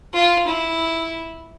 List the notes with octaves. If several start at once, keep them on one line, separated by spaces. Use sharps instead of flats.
F4
E4